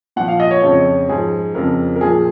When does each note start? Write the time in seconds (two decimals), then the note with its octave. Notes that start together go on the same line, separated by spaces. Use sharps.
0.16 A#2 F3 F#5
0.28 F5
0.40 D#5
0.51 C#5
0.62 F2 C#3 F3 C#5
1.09 G#2 F3 G#4
1.55 F2 C#3 F3 A#4
1.96 A#4
2.01 A#2 F3 G#4